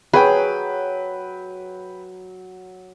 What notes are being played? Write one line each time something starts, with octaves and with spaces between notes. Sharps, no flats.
F#3 G#4 B4 G5